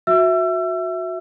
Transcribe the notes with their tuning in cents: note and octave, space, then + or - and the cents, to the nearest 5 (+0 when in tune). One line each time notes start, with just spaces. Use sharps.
F#4 -20 E5 +0 E6 +30